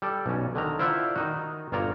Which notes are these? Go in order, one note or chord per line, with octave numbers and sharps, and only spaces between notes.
G3 A4 D5
B1 C#4
D3 D#3 A#5
E4 F4 C5 D5 E5 F#5
D#3 D#4 F#4
G1 A#2 F4 C#5 D5 A#5